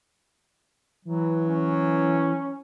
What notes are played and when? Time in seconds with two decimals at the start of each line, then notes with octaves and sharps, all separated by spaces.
1.05 E3 F#3
1.49 C#4